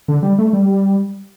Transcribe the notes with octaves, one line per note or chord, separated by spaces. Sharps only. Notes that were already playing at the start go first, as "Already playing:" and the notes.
D3
G3
A3
G3